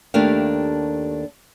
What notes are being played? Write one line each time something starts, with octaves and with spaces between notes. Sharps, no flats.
D#2 A3 D4 G4 A#4 F5